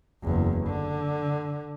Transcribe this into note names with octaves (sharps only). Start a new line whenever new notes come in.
F#1 E2
D3